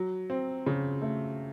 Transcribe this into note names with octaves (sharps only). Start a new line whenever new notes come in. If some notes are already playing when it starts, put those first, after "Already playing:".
Already playing: F#3
C4
C#3
A3